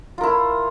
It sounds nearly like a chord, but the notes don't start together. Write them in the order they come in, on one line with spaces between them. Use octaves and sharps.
F4 A#4 E4